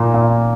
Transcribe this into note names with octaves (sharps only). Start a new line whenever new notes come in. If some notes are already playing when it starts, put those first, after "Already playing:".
Already playing: A#2 A#3
A#2